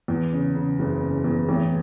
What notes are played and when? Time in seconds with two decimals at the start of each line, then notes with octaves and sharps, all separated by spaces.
0.08 E2
0.33 C#3
0.55 C#3
0.79 F#1
1.02 C#3
1.24 E2
1.49 A1